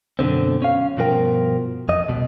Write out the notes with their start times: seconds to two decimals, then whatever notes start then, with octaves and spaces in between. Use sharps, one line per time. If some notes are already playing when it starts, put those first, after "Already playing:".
0.19 F#2 B2 D3 C4
0.62 C#4 F5
0.97 G2 B2 F3 A#4 G5
1.89 F2 D#5
2.08 C2 B2